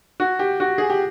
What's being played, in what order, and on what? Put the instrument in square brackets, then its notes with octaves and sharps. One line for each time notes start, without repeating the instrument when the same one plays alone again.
[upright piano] F#4
G4
F#4
G#4
G4